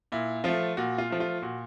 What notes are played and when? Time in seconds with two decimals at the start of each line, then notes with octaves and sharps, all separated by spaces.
0.12 A#2 E4
0.44 F3 A3 F4
0.77 A#2 F#4
0.98 F4
1.10 F3 A3
1.20 F4
1.42 A#2 F#4